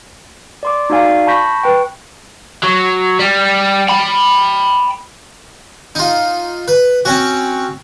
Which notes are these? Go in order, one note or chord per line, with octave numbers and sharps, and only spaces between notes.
D5 C6 D6
D#4 F#4 D5 F5 G#5
A5 B5 C#6 G6 A#6 B6
B4 G5 C#6
F#3
G3
G5 B5
D#4 F4
B4
C4 C#4 F#4